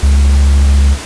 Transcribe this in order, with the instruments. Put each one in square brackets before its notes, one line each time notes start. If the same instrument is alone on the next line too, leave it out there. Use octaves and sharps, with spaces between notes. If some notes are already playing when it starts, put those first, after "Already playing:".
[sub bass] C#2